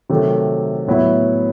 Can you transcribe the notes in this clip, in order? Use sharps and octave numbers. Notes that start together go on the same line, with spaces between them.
C3 D#3 F#3 A3
A2 F#3 B3 E4